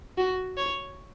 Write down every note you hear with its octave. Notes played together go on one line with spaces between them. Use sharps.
F#4
C#5